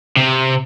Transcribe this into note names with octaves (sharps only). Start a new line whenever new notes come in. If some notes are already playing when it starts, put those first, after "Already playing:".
C3